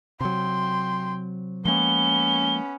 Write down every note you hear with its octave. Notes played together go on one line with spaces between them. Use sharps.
C3 F#3 G5 C6
F3 G#3 A#3 B3 C#4 G7